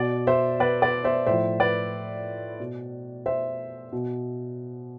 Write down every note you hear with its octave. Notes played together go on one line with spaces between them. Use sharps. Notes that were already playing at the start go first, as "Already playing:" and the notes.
Already playing: B2 D5
C5 E5
B4 D5
B4 D5
C5 E5
A2 F3 C5 E5
B4 D5
B2
C5 E5
B2